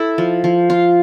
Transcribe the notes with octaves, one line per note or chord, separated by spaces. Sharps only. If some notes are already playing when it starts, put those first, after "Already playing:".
Already playing: E4 A4
F3
F3
F4